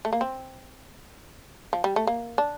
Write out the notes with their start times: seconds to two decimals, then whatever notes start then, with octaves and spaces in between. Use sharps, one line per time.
0.05 A3
0.13 A#3
0.21 C4
1.73 F3
1.84 G3
1.96 A3
2.07 A#3
2.38 D4